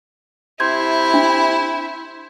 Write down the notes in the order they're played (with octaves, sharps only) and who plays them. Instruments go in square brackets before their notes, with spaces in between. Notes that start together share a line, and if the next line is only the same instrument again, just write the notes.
[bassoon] C3 [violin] E4 [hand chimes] C6 G6 G#6
[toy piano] D4